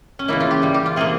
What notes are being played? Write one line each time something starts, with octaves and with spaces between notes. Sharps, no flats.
C#4
C#3 E3 A#3 E4
F4
G4
E3 G3 A#3
G4
F4
C3 E3 A#3 G#4